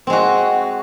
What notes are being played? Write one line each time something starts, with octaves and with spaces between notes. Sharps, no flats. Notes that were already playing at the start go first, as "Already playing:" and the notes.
G#3 C4 F#4